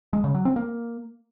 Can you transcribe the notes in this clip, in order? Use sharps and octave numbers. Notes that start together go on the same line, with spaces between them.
G#3
C#3
F#3
C4
A#3